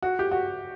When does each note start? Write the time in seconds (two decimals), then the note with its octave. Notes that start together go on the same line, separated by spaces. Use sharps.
0.02 F#4
0.19 G4
0.31 F#4